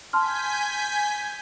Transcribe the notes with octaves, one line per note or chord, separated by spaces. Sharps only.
G#5 A5 C6 F6 G6 B6